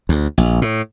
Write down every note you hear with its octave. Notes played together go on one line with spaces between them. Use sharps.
D2
A#1
A2